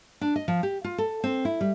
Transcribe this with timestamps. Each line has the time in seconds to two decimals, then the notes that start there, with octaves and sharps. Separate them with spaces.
0.21 D4
0.36 D#5
0.48 F3
0.63 G4
0.84 F4
0.98 A4
1.24 C4
1.45 E4
1.61 G3